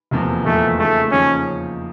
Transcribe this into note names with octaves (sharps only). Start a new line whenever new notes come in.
F1 E2 C3 F3 A#3
F1 E2 C3 F3 A3 A#3
C#3 F3 A3 A#3 D#4 G#4
C#3 F3 A#3 C#4 D#4 G#4